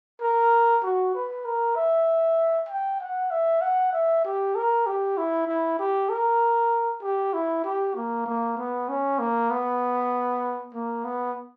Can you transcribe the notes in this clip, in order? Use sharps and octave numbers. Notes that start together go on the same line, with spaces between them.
A#4
F#4
B4
A#4
E5
G5
F#5
E5
F#5
E5
G4
A#4
G4
E4
E4
G4
A#4
G4
E4
G4
A#3
A#3
B3
C#4
A#3
B3
A#3
B3